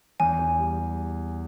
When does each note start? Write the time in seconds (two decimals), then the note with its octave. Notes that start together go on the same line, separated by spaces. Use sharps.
0.20 E2 G#5
0.39 E2
0.59 G3
0.79 G3